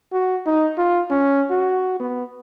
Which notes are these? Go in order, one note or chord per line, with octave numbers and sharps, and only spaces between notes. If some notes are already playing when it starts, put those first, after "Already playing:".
F#4
D#4
F4
C#4
F#4
B3